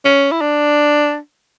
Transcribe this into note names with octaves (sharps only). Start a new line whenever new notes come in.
C#4
E4
D4